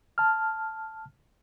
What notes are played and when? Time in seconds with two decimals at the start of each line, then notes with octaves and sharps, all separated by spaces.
0.18 A5 F6